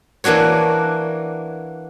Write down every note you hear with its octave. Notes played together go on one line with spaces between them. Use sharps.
E3 A#3 D4 F#4 C#5